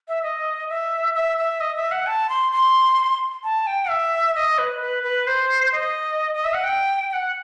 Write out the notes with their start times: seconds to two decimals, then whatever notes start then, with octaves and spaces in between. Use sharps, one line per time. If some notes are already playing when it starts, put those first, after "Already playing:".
0.08 E5
0.23 D#5
0.69 E5
1.15 E5
1.38 E5
1.61 D#5
1.76 E5
1.91 F#5
2.07 A5
2.29 C6
2.52 C6
3.44 A5
3.67 G5
3.90 E5
4.35 D#5
4.58 B4
4.81 B4
5.03 B4
5.27 C5
5.73 D#5
6.34 D#5
6.45 E5
6.54 F#5
6.64 G5
7.10 G5
7.13 F#5